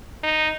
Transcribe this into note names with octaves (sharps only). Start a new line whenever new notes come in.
D#4